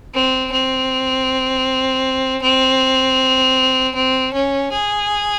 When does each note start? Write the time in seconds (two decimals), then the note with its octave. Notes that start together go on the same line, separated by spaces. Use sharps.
0.14 C4
0.52 C4
2.42 C4
3.95 C4
4.34 C#4
4.72 G#4